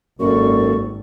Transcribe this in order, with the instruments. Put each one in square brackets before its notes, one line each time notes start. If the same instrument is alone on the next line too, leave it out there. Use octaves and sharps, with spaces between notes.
[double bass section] G#1 [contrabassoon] F#2 [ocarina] A#3 [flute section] A4 D5 C#6